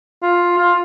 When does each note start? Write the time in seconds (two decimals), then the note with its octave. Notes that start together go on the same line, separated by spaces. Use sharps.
0.23 F4
0.58 F4